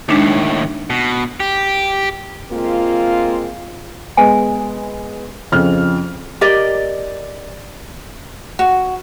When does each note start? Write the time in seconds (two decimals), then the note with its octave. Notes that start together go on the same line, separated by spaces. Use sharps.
0.09 D#2 A2 G#3 D4 D#4
0.90 B2
1.40 G4
2.52 G#3 A#3 C4 F4
4.17 G#3 B3 G#5
5.52 F2 C#3 F6
6.41 G4 A#4 D5 D#5
8.59 F#4